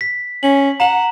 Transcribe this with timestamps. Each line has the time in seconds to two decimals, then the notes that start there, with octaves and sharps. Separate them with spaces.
0.01 B6
0.43 C#4 F#7
0.80 F#5 A#5 E7 F#7